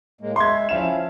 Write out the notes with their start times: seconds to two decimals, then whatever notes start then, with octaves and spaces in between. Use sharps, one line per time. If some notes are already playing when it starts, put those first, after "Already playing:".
0.21 A2 G#3 A#3
0.36 G#3 E5 C6 G#6
0.69 F3 C#4 E4 E5 F5 E7